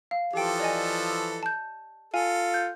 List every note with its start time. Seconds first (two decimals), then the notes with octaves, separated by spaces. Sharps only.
0.11 F5
0.33 E3 F3 G4 A4 G5
0.60 D5 D#5 G#5
1.43 A5 G6
2.14 F4 A4 G#5
2.54 G6